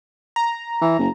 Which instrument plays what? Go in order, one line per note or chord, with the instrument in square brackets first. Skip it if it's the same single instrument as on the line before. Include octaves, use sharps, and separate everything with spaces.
[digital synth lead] A#5
[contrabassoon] E3
F#1